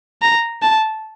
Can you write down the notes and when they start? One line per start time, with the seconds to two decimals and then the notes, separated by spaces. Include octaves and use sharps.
0.22 A#5
0.62 A5